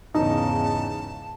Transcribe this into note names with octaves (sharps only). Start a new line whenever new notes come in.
E2 G#2 C#3 D#4 A5